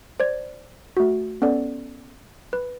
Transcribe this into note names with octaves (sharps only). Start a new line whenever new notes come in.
C5 D5 G#6
A3 F#4
B3 C#4 A4 D5
B4